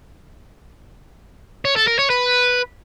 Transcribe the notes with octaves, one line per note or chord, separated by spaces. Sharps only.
C#5
A4
A#4
C#5
B4